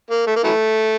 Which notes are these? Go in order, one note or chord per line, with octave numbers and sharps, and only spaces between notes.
A#3
A3
A#3
E3 F#3 A3